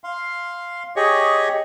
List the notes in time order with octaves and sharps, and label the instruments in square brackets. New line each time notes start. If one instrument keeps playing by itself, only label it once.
[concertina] F5 C6
G4 G#4 C#5 D#5 C#6